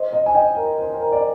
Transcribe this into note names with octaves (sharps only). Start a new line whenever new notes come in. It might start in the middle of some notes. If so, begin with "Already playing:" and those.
Already playing: C5 D#5
C5 D#5
G#5
D#5 G5
A#4
C5
C5
A#4
D5